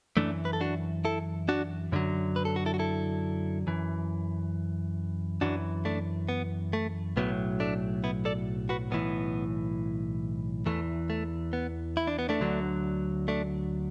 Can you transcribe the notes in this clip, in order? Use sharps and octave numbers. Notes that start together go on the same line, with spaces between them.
F#2 E3 A3 D4
B4
A4
D4 F#4
E4 A4
D4 F#4
F#2 D3 F#3
B4
A4
F#4
E4 A4
F#4
E4 A4
F#2 E3
F#2 E3 D4 F#4
A3 D4
B3
A3
B1 A2 F#3 B3
A3 D4
B3 E4
A4 D5
F#4 B4
B1 A2 E3 B3
E2 E3 A3
A3
B3
E4
D4
B3
A3 D4
D2 D3 F#3
A3 D4